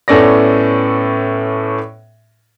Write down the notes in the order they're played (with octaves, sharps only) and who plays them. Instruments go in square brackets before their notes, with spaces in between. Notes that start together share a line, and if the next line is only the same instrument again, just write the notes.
[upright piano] A2 B3 C#4 A4 D5 A#6